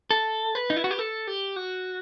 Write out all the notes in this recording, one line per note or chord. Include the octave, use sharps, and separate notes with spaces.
A4
B4
D#4
E4
F#4
G4
A4
G4
F#4